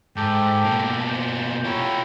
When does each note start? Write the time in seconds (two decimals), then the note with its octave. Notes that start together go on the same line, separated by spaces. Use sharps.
0.16 G#2 G4 A4 G5
0.64 B2 A#3
1.08 C5
1.65 E4 F4 G4 C#5 A#5